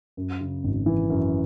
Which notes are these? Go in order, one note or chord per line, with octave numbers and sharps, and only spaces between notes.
F#2
C#3
G#1
E3
F#2